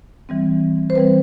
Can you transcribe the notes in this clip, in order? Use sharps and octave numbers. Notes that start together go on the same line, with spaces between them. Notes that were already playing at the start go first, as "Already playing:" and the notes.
E3 G3 C4
C5
E3 G3 C4 B4